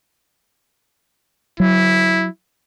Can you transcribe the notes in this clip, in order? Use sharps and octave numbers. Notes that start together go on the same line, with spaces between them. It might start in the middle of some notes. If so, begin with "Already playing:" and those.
F#3 E4